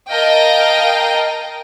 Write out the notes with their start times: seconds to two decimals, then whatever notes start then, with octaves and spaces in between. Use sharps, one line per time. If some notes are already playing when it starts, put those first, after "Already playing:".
0.11 A#4 D#5 F5 G5 A5